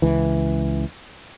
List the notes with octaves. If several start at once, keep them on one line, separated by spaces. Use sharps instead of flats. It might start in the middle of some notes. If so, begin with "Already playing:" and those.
C#2 E3